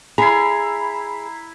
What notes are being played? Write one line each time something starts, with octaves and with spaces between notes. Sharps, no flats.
E4 G#4 A#5 B5 C7